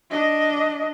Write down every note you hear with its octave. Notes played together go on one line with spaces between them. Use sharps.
D4 D#5